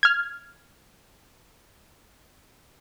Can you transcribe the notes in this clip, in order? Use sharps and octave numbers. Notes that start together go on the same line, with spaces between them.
F6 G#6